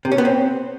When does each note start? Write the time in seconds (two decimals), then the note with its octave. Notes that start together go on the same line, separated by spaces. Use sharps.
0.05 C3
0.12 C#4
0.18 B3
0.25 C4